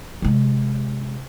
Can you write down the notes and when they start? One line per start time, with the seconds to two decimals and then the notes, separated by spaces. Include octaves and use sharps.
0.22 C3 G#3